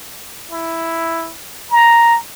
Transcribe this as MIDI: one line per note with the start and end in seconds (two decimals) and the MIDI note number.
0.51 1.33 64
1.71 2.17 82